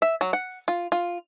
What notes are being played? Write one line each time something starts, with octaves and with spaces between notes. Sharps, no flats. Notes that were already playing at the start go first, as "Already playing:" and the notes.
E5
F#3
F#5
F4
F4